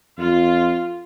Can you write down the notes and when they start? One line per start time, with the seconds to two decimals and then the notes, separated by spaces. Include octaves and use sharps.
0.18 F2 F4